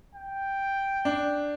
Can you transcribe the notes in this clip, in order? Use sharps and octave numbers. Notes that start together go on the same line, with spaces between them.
G5
D4